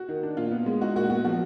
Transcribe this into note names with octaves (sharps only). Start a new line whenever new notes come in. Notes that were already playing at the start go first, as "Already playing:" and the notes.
Already playing: F#4
D#3
D4
A#2 F4
B3
G#3
D#4 F#4
A#2 F#4
B3 F#4
F3 F#4